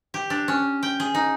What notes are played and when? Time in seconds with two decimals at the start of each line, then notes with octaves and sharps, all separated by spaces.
0.14 G4
0.30 D4
0.48 C#4
0.83 G5
1.00 G#4
1.15 D#4